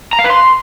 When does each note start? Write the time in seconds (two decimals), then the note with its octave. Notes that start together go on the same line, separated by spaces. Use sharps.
0.13 A#5
0.19 F5
0.24 B4
0.30 C6